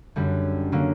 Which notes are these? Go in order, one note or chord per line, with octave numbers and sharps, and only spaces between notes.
F#2 D3 G3
D3 F#3 A#3